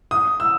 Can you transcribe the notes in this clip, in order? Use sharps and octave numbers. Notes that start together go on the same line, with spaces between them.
D#6
E6